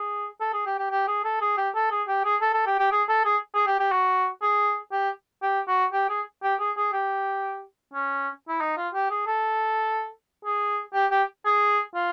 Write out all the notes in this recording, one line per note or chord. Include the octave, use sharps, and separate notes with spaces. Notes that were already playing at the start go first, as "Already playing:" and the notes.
Already playing: G#4
A4
G#4
G4
G4
G4
G#4
A4
G#4
G4
A4
G#4
G4
G#4
A4
A4
G4
G4
G#4
A4
G#4
G#4
G4
G4
F#4
G#4
G4
G4
F#4
G4
G#4
G4
G#4
G#4
G4
C#4
E4
D#4
F4
G4
G#4
A4
G#4
G4
G4
G#4
F4